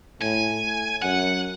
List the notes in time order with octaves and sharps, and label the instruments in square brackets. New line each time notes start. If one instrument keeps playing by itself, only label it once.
[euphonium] A2 [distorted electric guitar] G#5
[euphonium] F#2 [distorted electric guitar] F#5